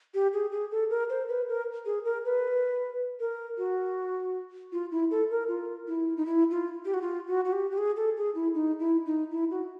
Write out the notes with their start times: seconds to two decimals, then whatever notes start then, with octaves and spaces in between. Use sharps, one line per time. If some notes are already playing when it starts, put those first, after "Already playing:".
0.14 G4
0.33 G#4
0.52 G#4
0.71 A4
0.90 A#4
1.10 C5
1.28 B4
1.49 A#4
1.86 G#4
2.05 A#4
2.25 B4
3.20 A#4
3.58 F#4
4.72 F4
4.92 E4
5.11 A4
5.30 A#4
5.48 F4
5.88 E4
6.17 D#4
6.26 E4
6.51 F4
6.85 G4
6.94 F#4
7.02 F4
7.28 F#4
7.45 F#4
7.53 G4
7.71 G4
7.78 G#4
7.97 A4
8.17 G#4
8.35 E4
8.54 D#4
8.79 E4
9.06 D#4
9.31 E4
9.51 F#4